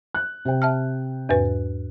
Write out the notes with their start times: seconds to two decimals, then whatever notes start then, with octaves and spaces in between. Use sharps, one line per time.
0.14 F#6
0.45 C3 G5
0.62 E5 A5 F6
1.29 E2 G#2 B4